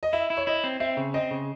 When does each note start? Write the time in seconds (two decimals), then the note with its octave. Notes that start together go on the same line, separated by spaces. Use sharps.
0.03 D#5
0.13 E4 E5
0.30 E4
0.37 C#5
0.47 E4 D#5
0.64 C4
0.80 C4 E5
0.97 C#3
1.14 C4 D#5
1.31 C#3